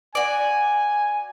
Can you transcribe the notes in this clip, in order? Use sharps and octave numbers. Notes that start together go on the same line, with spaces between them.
F#4 D5 G#5